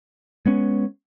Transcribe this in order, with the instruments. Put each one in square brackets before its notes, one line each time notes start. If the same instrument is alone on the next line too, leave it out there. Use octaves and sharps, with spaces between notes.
[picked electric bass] G#3 B3 C#4